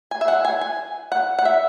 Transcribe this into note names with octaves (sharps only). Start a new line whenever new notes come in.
G#5
E5
F#5
G#5
G#5
F#5
F#5
E5